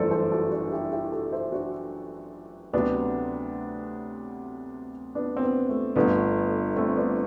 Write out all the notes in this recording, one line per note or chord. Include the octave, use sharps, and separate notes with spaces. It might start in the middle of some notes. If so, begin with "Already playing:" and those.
Already playing: G1 F#2 E3 A3 A4 C5 D5
A4 C5
F#4 A4
D4 F#4
E4 G4
E4 G4
F#4 A4
C5 E5
D4 F#4
D2 C3 F#3 B3 D4
B3 D4
C4
B3
A3
G1 G2 D3 A3 B3
A3 C4
B3 D4